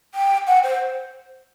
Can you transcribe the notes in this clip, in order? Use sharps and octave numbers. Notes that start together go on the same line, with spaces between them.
G5
F#5
C5